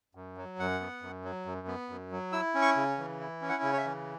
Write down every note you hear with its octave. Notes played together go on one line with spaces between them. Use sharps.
F#2
F#3
F#2 F#5
B3
F#2
F#3
F#2
B3
F#2
F#3
E4 E6
C#4
C#6
C#3
E3
E4
C#4
F#5
C#3
C#5
E5
E3